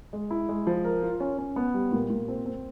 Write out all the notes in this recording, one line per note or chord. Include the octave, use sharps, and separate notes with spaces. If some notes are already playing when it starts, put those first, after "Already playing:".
G#3
E4
G#3
F3
A#4
F4
C#4
C#4
B3
G3
A#2
A#2
C4
C4